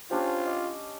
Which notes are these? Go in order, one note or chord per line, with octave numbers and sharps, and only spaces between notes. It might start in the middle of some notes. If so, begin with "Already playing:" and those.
C#4 D4 F4 G4 C5
D#5 D6